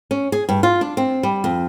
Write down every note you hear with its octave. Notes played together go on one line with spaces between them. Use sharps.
C#4
G#4
G2
F4
D4
C4
G3
F2